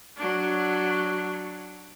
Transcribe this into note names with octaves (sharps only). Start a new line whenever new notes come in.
F#3 D4